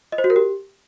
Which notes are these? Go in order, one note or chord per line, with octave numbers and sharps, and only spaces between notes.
D#5
C5
F#4
A#4
G4